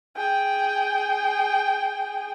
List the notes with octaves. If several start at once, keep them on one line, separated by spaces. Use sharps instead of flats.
G#4 G5